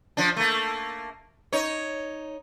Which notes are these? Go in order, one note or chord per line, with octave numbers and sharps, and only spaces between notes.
F3 D4
A3 A#3
D#4 C#5